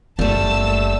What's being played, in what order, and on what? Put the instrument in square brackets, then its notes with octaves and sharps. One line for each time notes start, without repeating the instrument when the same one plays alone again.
[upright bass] F#1 A#3 [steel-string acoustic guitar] G3 A3 [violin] A5 E6